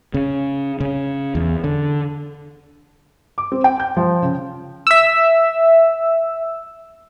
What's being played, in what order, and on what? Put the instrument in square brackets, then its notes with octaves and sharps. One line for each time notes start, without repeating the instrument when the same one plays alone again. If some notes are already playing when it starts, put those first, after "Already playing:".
[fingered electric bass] C#3
C#3
E2
D3
[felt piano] D6
C4
G5
G6
F3
C#3
[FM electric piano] E5 E6